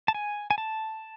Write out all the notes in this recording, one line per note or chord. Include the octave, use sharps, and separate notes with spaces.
A5
G#5
G#5
A5